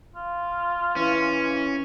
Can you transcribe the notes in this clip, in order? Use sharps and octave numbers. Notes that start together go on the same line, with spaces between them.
F4
E3 C#4